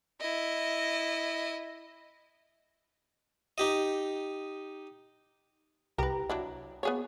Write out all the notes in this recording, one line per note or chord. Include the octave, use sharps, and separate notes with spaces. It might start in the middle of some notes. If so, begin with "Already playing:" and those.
E4 D#5
D#4 G4 D#5
C2 G4 A#4 B4 A#5
F#3 D4 E4
B3 G#4 C#5